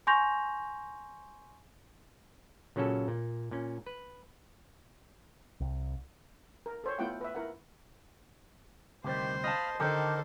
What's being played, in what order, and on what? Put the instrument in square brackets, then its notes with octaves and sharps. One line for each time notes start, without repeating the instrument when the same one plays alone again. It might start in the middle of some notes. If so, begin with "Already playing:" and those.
[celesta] G#5 C6 C#6 G6 A#6 F7
[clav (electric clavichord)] A#2 C#3 F#3 C#4 F#4 A4
A#2
A#2 C#4
B4
[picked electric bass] C2
[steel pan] A#4
A4 C5 C#5
A3 B3 E4 F4 F#5 G5
B4 E5
E4 A#4 F#5
[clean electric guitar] D2 C3 G3 [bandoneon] D#3 G4 [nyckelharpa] C5
[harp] D#5 A5 [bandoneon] F5 B5 F6
[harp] D3 [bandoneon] D#3 D#4 A#4 [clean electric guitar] D4 G4 [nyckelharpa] A4 C5